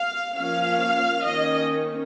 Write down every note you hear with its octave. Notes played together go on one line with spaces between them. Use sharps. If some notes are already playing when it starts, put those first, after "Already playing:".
Already playing: F5
F3 A#3 C#4 F5
D#3 A#3 C#4 D#5